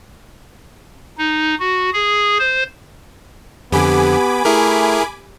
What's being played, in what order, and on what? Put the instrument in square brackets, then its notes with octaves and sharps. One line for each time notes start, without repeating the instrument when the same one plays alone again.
[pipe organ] D#4
F#4
G#4
C5
[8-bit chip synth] F2 D3 [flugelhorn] B3 [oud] G4 [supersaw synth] G#5 B5 D6
[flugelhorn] A3 [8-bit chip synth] E4 G#4 A#4